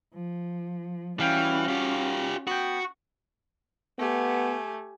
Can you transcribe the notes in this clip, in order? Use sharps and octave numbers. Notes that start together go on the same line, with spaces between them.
F3
E3 G3 C#4 F#4 F5 G5
F4 G4
B3 F#4 G5
A3 B3 G4 G#5